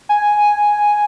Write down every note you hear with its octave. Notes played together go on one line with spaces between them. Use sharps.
G#5